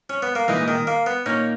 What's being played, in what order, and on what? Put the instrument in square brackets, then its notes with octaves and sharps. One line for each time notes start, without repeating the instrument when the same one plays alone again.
[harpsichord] C#4
B3
A#3
[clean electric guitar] A#2 G#3 D#4 A#4 D#5 [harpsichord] E3
[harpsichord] D#3
A#3
B3
[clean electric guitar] A#2 A#3 D#4 A#4 [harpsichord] C#4